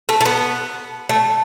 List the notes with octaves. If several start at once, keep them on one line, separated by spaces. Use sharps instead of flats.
A3
A3
B3
A3